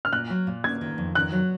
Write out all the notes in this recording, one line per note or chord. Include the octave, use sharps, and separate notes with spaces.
F6
A#2 F#6
F#3
A#2
A#3 G#6
D#3
F2
D#3 F#6
F#3